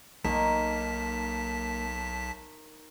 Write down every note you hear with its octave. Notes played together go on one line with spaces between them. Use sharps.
B1 D#3 A#3 A5 B6